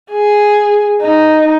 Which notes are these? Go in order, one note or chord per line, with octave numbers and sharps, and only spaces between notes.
G#4
D#4